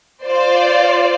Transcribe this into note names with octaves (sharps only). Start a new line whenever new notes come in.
F4 C5 D5